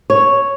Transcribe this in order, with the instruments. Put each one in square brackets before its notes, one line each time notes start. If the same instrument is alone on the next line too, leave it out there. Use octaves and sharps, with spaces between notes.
[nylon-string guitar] C#5